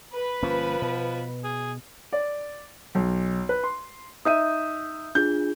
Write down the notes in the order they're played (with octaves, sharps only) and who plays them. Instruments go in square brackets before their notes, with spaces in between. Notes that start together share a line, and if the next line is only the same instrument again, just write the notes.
[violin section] B4
[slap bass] G1 A#3 C#4 [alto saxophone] F3
[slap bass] B2
[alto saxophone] G#4
[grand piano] D5
B1
B4
C6
[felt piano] D#4 E5 D#7 [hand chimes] D#6 G6
[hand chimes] D4 F4 G#4 [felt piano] G6